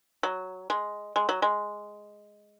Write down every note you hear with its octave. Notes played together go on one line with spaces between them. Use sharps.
F#3
G#3
G#3
F#3
G#3